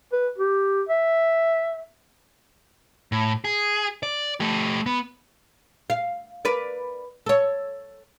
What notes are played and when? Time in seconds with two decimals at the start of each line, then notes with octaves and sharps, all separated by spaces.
0.13 B4
0.38 G4
0.89 E5
3.12 A2
3.44 G#4
4.03 D5
4.40 A3 G4
4.86 B3
5.90 F5
6.45 A#4 B4 D5
7.26 A4 C#5